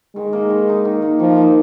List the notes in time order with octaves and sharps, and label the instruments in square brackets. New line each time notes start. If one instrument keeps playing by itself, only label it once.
[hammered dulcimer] D#3 [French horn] G#3
[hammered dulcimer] A#3 D#4
D#3
A#3 D#4
D#3
A#3 D#4
[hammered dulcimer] D#3 [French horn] F3
[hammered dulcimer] A#3 D#4